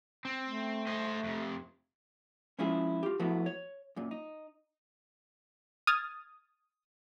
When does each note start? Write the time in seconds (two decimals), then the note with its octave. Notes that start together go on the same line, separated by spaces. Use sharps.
0.25 C4
0.44 A3
0.87 C5 D#5
1.24 F2 C3
2.59 F3 G#3 C#4 E4 F4 G#4
3.03 F4 G4
3.20 F3 F#3 A3 B3 E4 F#4
3.46 C#5
3.96 F#2 A#2
4.11 D#4
5.87 D#6 F6 G#6 A6